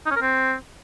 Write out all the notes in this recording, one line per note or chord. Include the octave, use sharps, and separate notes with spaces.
D#4
C#4
A#4
C4